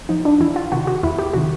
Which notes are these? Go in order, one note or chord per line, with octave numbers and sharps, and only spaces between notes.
F3 D#4
D4
E2 E4
F4
C3 D#3 F#4
F#4
E2 E4
G4
C3 D#3 F#4